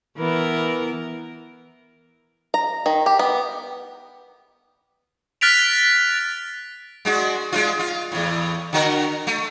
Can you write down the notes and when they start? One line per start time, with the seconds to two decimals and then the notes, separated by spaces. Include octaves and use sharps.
0.18 E3 B3 A#4
2.54 A#5
2.86 D#3
3.06 G4
3.19 B3
5.41 F6 F#6 A6 B6 D7 F7
7.05 G#3 D4 F#4
7.52 G#3 D4 F4
7.79 F4
8.12 E2 A2
8.73 D3 F#4 A#4
9.27 A3